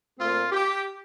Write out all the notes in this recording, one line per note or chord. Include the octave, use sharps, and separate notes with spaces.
A#2 A3 C4 F4
G4